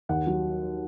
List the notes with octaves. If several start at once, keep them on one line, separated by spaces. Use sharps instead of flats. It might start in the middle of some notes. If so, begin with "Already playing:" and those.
D#2 F#5
F#3